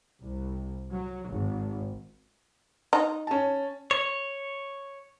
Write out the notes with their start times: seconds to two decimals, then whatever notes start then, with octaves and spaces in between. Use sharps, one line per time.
0.21 C2
0.92 F#3
1.29 G#1
2.93 D#4
3.27 C#4 A5
3.91 C#5